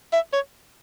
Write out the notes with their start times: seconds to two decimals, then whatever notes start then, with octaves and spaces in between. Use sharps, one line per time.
0.13 E5
0.33 C#5